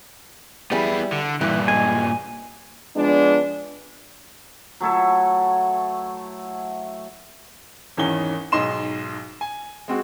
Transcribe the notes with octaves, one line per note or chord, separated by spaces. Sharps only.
G3 B3 E4 G#4
D3
G2 A#2 E3
G#3 G#5
F3 G#3 B3 D4
F#3 A3 E4 A4
G#1 E2 D#3 C#4 G7
B1 G#2 D#5 C6 E7
G#5
G#3 C4 F#4